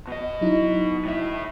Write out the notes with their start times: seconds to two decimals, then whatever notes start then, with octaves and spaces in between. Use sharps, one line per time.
0.07 B2 D#5
0.41 F#3 D#4 E4
1.05 A2 E5